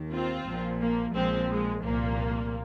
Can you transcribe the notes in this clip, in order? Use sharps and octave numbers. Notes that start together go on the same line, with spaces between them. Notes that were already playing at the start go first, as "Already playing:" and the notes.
Already playing: D#2 D#3
C4 F4
A#1 A#2 F3
A#3
A#1 A#2 F3 G#3 C4
G#3
C2 A#2 F3 A#3